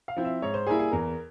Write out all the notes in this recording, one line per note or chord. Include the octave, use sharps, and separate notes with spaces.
F5
F3 C4 E4
E5
G#2 C#5
C5
G3 A#3 E4 G#4
G#4
E2 A#4